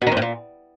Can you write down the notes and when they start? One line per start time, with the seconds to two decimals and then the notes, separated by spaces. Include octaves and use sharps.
0.02 B2
0.07 D#3
0.12 F2
0.17 A2
0.22 A#2